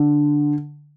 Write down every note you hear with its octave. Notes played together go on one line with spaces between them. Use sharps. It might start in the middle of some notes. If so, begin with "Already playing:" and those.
Already playing: D3